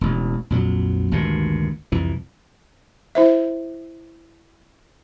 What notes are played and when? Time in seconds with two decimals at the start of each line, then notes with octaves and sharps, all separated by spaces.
0.01 E1 A1
0.50 A#1 F2 F#3
1.11 G#1 D2 G2 A#2
1.92 C2 F2 E3
3.15 E4 C5 E5